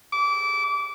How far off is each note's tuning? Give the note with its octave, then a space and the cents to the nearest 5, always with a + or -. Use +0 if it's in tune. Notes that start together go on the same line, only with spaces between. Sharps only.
D6 -25